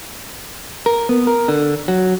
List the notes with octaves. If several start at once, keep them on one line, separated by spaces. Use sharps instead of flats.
A#4
B3
A#4
D3
F#3